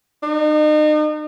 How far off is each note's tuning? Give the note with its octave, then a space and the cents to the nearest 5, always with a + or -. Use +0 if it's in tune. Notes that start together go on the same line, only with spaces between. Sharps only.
D#4 -35